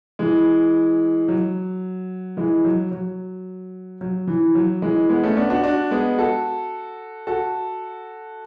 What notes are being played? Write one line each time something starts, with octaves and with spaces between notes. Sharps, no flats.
E3 G#3
F#3
E3 G#3
F#3
F#3
F#3
E3
F#3
E3 G#3
G#3 B3
A3 C#4
B3 D4
D4 F#4
D4 F#4
G#3 B3
F#4 A4
F#4 A4